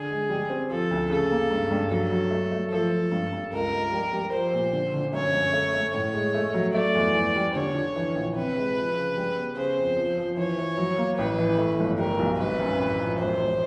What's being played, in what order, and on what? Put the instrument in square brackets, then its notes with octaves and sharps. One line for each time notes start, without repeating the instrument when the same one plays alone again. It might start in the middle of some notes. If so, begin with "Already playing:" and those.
Already playing: [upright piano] D3 [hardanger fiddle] G#4
[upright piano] G#3
G3
C4
[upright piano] F3 [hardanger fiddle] A4
[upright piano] D2
[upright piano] C#3 [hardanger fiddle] A4
[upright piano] A#3
G2
G2
[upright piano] F#3 [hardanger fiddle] A4
[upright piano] F#3
A3
A3
[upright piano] F3 [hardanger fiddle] A4
[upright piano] F3
G2
G2
[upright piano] C#2 [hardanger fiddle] A#4
[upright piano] C#2
G3
G3
[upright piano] F3 [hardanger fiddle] C5
[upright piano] A#2
D3
D3
[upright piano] F#2 [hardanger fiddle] C#5
[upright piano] F#2
A3
A3
[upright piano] A2 [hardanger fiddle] C#5
[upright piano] G#3
A3
F#3
[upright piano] A3 [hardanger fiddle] D5
[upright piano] E2
E2
G3
[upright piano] D3 [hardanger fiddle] C#5
[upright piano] D3
E3
A#1
[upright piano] C3 [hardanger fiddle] B4
[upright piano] G#3
F3
C#3
G3
B3
[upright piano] C#3 [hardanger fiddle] C5
[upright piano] F2
F3
F3
[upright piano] E3 [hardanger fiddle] C#5
[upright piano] E3
F#3
A#3
[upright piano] A1 [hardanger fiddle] B4
[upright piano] E3
A3
G1
[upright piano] G3 [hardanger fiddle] A#4
[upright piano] B1
[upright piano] G#1 [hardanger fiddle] B4
[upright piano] F#2
A1
F3
[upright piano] E1 [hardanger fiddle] C5
[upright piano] E1